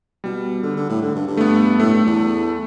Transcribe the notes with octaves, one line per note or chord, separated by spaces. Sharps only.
B2 G3
D3
D3
A2
D3
G2
G2
A3
B3
A2 A3
G2
E2